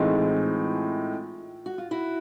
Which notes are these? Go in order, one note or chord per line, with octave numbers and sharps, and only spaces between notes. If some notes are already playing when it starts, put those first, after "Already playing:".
Already playing: A2 E3 G#3 C4 D#4 F4
F#4
F4
E4 F#4